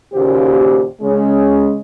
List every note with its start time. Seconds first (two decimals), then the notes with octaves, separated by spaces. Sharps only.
0.13 D#2 A#2 C#3 F#4 G4 C5
1.01 C#3 G#3 C#4